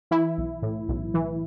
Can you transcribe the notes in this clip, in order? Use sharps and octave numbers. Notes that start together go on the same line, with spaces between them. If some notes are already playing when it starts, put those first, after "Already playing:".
E3 E4
B1
A2
B1
E3